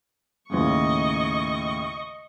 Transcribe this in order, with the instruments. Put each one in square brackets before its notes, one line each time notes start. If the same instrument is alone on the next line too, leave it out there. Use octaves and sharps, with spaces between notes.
[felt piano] D#2 A2 C#3 [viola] D#5 C#6